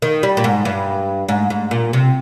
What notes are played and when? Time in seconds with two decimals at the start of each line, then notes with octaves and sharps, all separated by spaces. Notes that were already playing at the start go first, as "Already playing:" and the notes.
0.02 D#3
0.23 G3
0.37 A#2
0.44 G#2
0.65 G2
1.29 G#2
1.50 G#2
1.71 A#2
1.93 C3